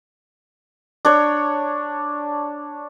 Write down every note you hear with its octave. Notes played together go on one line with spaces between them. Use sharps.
D4 C#5